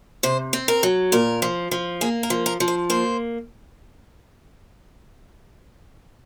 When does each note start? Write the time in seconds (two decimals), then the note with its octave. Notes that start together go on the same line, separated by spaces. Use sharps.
0.23 C3 C5
0.53 C4
0.68 A#4
0.83 F#3
1.12 A#2 A#4
1.42 F3
1.71 F3
2.01 A#3 G#4
2.23 A#4
2.30 F3
2.46 A#4
2.60 F3
2.68 C5
2.90 A#3 C5